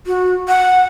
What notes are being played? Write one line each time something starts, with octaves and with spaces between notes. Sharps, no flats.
F#4
F#5